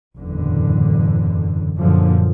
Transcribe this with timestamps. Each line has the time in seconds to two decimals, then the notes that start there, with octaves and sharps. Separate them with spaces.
0.17 F#1 E2 A2 D3
1.78 F#2 A#2 D3 F3